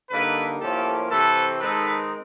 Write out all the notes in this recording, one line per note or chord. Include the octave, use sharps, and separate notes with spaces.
D3 G3 A#3 D#4 A4 B4
A2 F3 A#3 C#4 G4 A4
C3 E3 A3 C4 A4 B4
D#3 G#3 C4 D#4 A4 B4